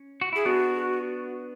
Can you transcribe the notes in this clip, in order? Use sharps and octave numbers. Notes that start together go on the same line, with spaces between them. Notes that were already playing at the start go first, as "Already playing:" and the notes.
Already playing: C#4
F#4
E4 G#4
B3 D4 F#4